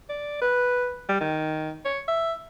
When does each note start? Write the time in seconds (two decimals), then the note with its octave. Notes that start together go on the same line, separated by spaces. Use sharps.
0.09 D5
0.41 B4
1.09 G3
1.21 D#3
1.85 C#5
2.08 E5